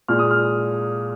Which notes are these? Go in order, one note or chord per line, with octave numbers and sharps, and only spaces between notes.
A#2 G#3 F6
D#6
F6